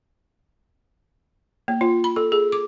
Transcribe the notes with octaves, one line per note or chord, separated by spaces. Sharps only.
A#3
F4
B5
A4
G#4
D6